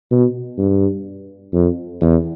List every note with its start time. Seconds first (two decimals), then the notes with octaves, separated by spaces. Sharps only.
0.11 B2
0.58 G2
1.53 F2
2.02 E2